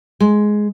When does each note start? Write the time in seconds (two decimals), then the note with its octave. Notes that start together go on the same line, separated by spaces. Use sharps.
0.20 G#3